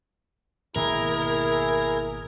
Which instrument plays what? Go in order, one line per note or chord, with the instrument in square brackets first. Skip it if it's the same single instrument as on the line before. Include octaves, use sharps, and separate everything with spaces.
[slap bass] G#1 B2 A#3 [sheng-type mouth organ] E4 G#4 [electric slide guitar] A#4